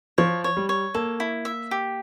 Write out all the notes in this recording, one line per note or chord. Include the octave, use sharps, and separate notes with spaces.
F3 C#5
C#5
G3
C#5
A#3 A4
E4
E5
G4